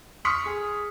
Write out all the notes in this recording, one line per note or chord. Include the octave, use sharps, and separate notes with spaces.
C6 C#6 D#6 F6 B6 C#7
G#4